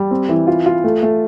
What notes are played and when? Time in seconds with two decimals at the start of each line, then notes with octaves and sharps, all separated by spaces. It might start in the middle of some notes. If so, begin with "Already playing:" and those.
Already playing: G3
0.11 C4
0.29 E3
0.47 F4
0.66 F4
0.84 A3
1.03 A3